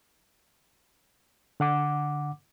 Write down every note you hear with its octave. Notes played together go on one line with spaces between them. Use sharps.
D3 F#5 D6